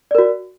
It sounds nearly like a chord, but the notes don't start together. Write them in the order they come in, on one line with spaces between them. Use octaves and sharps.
D5 A#4 F#4